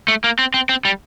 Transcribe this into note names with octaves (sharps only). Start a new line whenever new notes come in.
A3
A#3
C4
C4
C4
G3